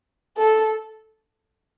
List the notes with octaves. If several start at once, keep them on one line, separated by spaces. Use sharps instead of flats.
A4